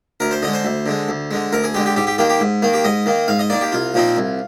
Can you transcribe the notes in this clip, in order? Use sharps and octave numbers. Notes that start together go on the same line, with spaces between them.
D2 A#4
C5
D3 G#3 D#5
C5
D2
D3 G#3
D2
D3 G#3
D2 A#4
G#4
D3 G#3 G4
G4
G#2 G4
G4
D#3 A#3 G4
G4
G#2
D#3 A#3
G4
G#2 D#5
D#3 A#3
G#2 F5
D#5
D#3 A#3 D5
G4
C2 F4
A#2 F3 C4 D#4
C2